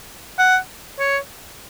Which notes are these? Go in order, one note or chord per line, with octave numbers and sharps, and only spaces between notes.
F#5
C#5